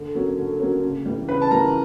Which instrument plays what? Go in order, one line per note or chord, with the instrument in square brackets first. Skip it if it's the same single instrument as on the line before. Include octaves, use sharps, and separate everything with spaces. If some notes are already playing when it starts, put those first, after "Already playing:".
Already playing: [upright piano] D3
F#3 A#3 C#4
D3
F#3 A#3 C#4
C#3
E3 G3
[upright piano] C#3 [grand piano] B4 B5
[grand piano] A5
[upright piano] E3 G3 [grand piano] A#4 A#5